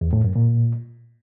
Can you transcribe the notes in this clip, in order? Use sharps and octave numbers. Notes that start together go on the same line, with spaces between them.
E2
A2
F#2
A#2